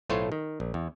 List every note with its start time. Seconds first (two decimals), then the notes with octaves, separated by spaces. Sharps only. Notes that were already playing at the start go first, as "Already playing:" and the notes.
0.09 B1 A2 A3 F4 C5 C#5
0.32 D#3
0.60 A#1
0.74 E2